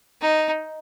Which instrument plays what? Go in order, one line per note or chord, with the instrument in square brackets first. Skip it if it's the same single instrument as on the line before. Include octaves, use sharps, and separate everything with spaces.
[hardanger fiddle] D#4